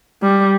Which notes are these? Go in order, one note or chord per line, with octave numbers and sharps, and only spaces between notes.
G3